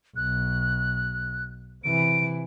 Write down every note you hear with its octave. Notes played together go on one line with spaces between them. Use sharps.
B1 F#6
C3 E3 D7